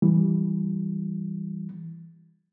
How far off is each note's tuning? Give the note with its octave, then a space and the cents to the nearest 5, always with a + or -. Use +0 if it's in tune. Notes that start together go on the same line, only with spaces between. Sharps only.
E3 +0 G3 +0